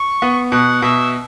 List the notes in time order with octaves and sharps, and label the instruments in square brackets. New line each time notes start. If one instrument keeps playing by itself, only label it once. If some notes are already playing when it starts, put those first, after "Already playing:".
Already playing: [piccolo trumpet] C#6
[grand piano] B3
[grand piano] B2 [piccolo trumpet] F#5
[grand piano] B2 [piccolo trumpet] E5